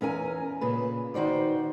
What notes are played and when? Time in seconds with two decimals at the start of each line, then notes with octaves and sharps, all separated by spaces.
0.01 E2 C#4 A#4 G#5
0.61 A#2 C#3 B4
1.14 D#3 F#4 C5 D5